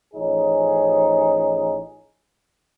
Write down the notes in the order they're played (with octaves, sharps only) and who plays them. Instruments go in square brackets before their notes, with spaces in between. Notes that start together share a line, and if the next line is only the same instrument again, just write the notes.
[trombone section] A1 F3 C#4 D#4 G#4